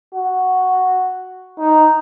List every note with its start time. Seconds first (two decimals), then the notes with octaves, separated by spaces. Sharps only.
0.15 F#4
1.58 D#4